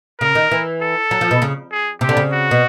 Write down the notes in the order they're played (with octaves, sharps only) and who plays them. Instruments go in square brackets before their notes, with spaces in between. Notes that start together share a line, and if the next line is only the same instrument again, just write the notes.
[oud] C#3 [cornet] A#4
[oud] D#3
E3
[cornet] A4
[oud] F#3
F3
B2
C#3
[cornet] G#4
[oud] C3 [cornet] G4
[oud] D3
C#3
[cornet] F#4
[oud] B2